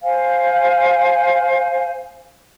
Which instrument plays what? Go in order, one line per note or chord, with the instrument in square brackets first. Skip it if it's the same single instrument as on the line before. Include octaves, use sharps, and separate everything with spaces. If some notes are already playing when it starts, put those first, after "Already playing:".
[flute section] C5 F5 G#5